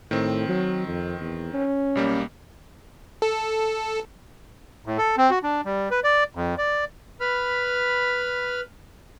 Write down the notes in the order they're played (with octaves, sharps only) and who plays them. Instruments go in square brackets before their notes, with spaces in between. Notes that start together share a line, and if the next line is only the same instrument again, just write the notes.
[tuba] A2 [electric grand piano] D#3 C4
[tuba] F#3
F2
E2
C#4
[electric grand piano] B1 G3 A#3
[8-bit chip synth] A4
[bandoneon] A2
A4
C4
F#4
D4
G3
B4
D5
F2
D5
[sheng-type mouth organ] B4 B5 F6